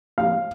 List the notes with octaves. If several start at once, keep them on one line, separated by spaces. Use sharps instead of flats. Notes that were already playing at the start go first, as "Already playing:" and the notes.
F5